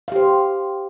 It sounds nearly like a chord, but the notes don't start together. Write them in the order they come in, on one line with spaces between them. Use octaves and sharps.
F5 G4 C5